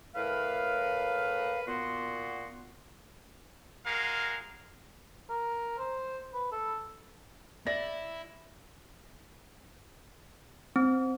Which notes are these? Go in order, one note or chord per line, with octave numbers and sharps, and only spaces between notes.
A2 A#4 B4 F5
A#2 B3 F#4 C6
G#3 F#4 A#4 F5
A#4
C5
B4
A4
E4 D5 A#6
C4